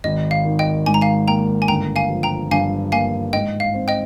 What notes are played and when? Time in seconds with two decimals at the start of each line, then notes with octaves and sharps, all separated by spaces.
0.04 G#1 D#5
0.31 F5
0.45 D#3
0.59 D#5 G5
0.86 G#2 G#5
0.94 A#5
1.01 F5 G#5
1.28 A#3 G5 A#5
1.62 G#5
1.68 G1 G5 A#5
1.96 F5 G#5
2.10 F3
2.23 G5 A#5
2.51 G2 F5 G#5
2.92 A#3 F5 G#5
3.33 G#2 D#5 G5
3.60 F5
3.74 C4
3.88 D#5 G5